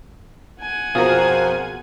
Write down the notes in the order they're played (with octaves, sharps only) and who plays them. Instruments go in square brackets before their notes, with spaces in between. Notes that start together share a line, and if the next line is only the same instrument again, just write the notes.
[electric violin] F#5 G#5
[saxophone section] F2 A#3 C5 [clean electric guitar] B2 G#4 [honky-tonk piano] F4 F#4 A#4